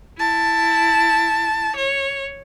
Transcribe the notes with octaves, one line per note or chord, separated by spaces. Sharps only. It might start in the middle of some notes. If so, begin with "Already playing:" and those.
E4 A5
C#5